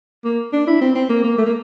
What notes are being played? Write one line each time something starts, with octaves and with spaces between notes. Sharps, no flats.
A#3
D4
E4
C4
C4
A#3
A#3
A3
A#3